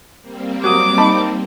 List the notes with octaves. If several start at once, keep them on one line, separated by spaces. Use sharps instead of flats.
G3 A#3 C4
F#3 D6 D#6
D#4 A5 B5